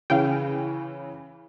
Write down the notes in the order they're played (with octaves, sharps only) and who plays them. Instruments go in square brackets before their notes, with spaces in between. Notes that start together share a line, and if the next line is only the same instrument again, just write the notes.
[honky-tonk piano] C#3 E3 [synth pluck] F5 G5